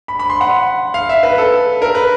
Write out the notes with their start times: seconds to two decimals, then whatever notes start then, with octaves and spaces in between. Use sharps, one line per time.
0.08 B5
0.19 B5
0.30 C6
0.41 F#5
0.94 F5
1.09 E5
1.23 B4
1.38 A4
1.82 A#4
1.95 B4